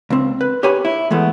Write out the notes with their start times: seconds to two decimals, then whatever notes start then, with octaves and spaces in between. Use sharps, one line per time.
0.10 C#2 C4
0.41 B4
0.63 G4 B4 C#5 G#5 B5
0.85 E4
1.11 E3 G#3 A3 B3